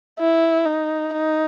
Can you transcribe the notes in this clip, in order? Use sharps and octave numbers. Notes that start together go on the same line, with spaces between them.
E4
D#4
D#4